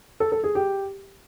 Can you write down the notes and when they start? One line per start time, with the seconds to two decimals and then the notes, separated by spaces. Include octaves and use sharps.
0.20 A4
0.32 A4
0.44 G#4
0.55 G4